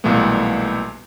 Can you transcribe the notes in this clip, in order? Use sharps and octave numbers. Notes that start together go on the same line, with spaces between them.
B1 A#2 E3 G3 A3 B3